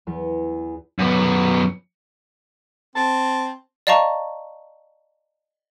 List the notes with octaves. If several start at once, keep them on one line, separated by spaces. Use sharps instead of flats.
E2
F#2 B3
C4 A5
D5 D#5 F5 A5 A#5 C#6